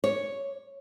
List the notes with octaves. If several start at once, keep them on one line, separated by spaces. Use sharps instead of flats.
C#5